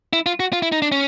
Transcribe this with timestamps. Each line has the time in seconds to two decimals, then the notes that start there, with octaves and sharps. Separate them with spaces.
0.13 E4
0.26 F4
0.40 F#4
0.53 F4
0.62 E4
0.72 D#4
0.82 D4
0.92 C#4